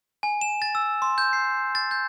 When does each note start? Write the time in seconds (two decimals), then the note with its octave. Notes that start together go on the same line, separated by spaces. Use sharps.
0.23 G#5
0.41 E7
0.62 A6
0.75 E6
1.02 C6
1.18 G6
1.33 C7
1.75 A6
1.91 G6